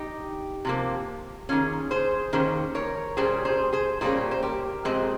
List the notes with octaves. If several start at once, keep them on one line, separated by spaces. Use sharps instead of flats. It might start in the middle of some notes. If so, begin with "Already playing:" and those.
Already playing: D#4 G4
C3 F3 A#3
D#3 A#3 C#4 F4 G#4
G#4 C5
D#3 A#3 C#4 G#4 C5
A#4 C#5
A#2 G3 A#3 C#4 G#4 C5
G#4 C5
G#4 C5
A#2 G3 A#3 C#4 G#4 C5
C5
G4 A#4
A#2 F3 G#3 C4 G#4 C5